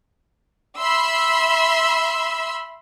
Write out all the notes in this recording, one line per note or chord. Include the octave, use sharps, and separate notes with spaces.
E5 B5 C6 E6